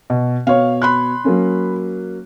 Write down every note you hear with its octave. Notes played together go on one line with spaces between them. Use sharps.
B2
B2 C#5 F5
B5 C6 F#6
F#3 A#3 C#4